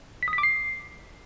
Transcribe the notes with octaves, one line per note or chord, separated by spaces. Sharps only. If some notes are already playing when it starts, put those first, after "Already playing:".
B6
D#6
B6
D6
C7